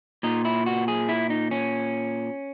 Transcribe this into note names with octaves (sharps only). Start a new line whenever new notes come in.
A#2 D#4
E4
F#4
G#4
E4
D#4
C#4